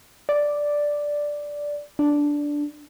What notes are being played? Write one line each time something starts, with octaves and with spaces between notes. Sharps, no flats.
D5
D4